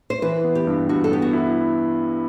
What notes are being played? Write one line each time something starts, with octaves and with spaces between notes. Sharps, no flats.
C5
E3 B4
B3
G4
G2
G2 F#4
A4
B3 G4
F#4
E4